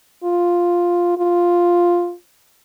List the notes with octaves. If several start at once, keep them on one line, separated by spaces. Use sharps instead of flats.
F4
F4